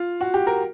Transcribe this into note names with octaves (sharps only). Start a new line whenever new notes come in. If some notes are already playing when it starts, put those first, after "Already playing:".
Already playing: F4
F#4
G4
A#4